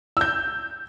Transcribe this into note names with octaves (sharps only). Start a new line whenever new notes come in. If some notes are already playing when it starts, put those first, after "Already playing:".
E6 G6